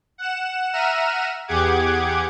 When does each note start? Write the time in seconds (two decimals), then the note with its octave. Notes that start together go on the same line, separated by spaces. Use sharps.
0.18 F#5 E7
0.73 E5 F#5 A#5 F6 D#7 E7
1.48 E2 G4 G#4 F#5 D6 G#6